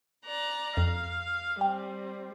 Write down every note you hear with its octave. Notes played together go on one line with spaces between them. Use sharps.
D5 A#5 F#6
F2 F5
G3 C4 G5